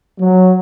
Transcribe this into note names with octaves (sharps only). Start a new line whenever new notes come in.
F#3